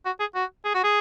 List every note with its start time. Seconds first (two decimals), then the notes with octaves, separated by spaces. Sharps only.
0.06 F#4
0.20 G#4
0.35 F#4
0.65 G#4
0.75 F#4
0.84 G#4